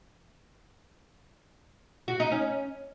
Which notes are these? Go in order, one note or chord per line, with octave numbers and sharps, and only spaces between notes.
F#4
D#4
C#4